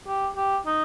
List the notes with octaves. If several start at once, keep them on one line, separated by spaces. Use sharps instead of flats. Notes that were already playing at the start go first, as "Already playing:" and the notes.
G4
G4
D#4